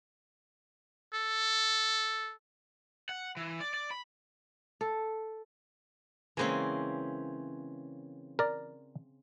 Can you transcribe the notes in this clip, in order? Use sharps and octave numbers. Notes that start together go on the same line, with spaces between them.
A4
F#5
E3
D5
D5
B5
A4
C#3 E3 G#3 A#3 C4 C#4
A#4 D5